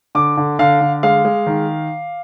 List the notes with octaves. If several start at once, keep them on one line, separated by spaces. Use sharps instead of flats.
D3 D6
D3
D3 F5
D3
G#3 F5
G#3
D#3